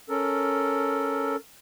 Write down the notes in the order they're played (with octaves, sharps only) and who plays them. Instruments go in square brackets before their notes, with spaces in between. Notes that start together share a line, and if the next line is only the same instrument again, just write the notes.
[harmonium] C#4 A4 A#4